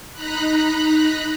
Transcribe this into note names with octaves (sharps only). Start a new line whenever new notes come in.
D#4 A#5 B5 F#6